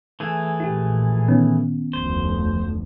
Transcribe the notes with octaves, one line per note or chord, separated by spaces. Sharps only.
E3 A3 G#4
A#1 A#2 E4 G4
D#3 B3 C#4
F1 D2 C5